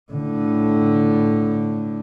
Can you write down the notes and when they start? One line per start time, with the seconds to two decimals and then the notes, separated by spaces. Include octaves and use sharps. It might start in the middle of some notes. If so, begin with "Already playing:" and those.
0.12 A2 D3